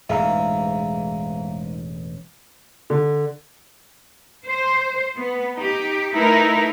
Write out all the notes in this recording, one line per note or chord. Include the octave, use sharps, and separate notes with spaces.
E1 A1 G#2 E5 F5 A#5
D3
C5
B3
D#4 G4
A3 D#4 E4 A#4 B4